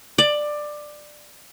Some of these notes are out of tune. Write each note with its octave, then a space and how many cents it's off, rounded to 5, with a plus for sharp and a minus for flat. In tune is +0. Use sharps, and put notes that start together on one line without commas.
D5 +15